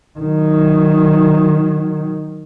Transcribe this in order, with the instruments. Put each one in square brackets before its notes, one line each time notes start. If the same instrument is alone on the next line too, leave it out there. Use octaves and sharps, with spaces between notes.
[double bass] D#3 F#3